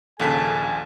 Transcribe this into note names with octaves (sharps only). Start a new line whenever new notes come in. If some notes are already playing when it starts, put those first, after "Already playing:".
A#1 D#2 A#2 C#3 G#4 A4 G#5 B6